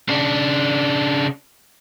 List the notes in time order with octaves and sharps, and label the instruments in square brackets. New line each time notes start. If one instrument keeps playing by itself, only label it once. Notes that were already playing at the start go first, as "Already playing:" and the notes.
[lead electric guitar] C#3 D4